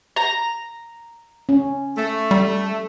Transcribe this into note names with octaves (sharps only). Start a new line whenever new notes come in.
A#5
C#4
A3
G3